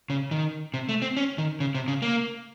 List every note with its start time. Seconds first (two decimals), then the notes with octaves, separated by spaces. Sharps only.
0.10 C#3
0.31 D#3
0.74 C3
0.89 A3
1.02 C4
1.17 C#4
1.38 D#3
1.60 C#3
1.75 C3
1.88 C#3
2.02 A#3